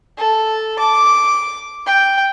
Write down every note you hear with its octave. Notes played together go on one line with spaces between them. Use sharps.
A4
D6
G5